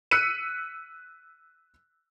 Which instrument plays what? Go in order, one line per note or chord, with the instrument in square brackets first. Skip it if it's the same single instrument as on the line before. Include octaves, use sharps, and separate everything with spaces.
[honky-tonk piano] E6 F#6 B6 C#7 D#7